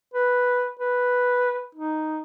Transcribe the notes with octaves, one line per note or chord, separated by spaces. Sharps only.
B4
B4
D#4